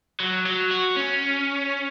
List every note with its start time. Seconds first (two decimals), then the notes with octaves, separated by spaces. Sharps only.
0.20 F#3
0.46 F#3
0.71 F#4
0.97 C#4